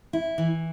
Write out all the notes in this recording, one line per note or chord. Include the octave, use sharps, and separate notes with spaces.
E4
E3